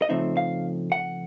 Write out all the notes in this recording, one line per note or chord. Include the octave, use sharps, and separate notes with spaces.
D#5
C#3 F3 A3 C4 D#4 E5
F5
F#5